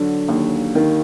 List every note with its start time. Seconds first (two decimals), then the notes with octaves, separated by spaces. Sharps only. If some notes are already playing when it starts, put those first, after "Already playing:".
Already playing: D3 F#3
0.28 D#2
0.75 D#3